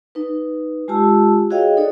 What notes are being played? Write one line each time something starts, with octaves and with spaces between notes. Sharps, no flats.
D#4 B4
G#3 F4 G4 A5 E6
F#4 G#4 C#5 D#5 F5 G5
D#4 A4 C#5 D5